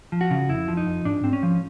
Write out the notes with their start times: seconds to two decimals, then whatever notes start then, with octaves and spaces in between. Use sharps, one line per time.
0.12 F3
0.21 F#4
0.31 C#3
0.49 F2 E4
0.68 F3
0.77 D#4
0.87 F2
1.05 G#2 D4
1.24 G#2 C4
1.33 C#4
1.43 F3